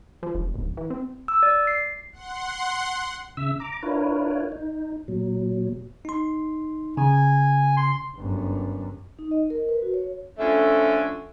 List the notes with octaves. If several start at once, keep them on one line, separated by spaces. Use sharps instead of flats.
F3
F1
D1
E3
C4
E6
D5
C7
F#5 C6
C#3 E5 E6
A#5 D6
D4 E4 F4 A#4 B4 C#5
D#4
A#2 F#3
D#4 C6
C#3 G#5
C6
G1 F#2
D#4
D#5
A#4
B4
F#4
C#5
D3 F3 A3 C#4